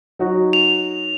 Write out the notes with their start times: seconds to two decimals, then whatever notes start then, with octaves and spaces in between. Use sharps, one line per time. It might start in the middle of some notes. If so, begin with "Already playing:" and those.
0.19 F#3 D#4 F#4
0.53 F7